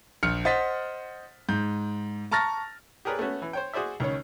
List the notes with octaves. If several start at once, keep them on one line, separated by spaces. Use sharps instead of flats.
A#1 F6 C#7
C5 D#5 F#5 A6 B6
G#2 G6
A5 A#5 C#6 F6 A6 A#6
G4 G#4 A#4 B4 C#5 D5
A3 B3 C#4 F#4
E3
C5 C#5 G5
F#4 G#4 C5 D5 E5
C#2 D#3 C#4 C#5